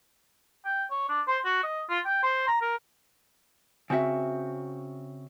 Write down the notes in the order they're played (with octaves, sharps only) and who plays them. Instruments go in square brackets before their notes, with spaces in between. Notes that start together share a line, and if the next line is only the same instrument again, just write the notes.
[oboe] G5
C#5
D4
C5
F#4
D#5
F4
G5
C5
A#5
A#4
[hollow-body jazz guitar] C#3 C4 F#4 E5